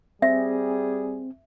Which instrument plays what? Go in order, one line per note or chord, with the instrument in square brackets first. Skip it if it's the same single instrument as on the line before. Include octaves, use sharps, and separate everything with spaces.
[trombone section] G3 G#4 [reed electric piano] C4 [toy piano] E5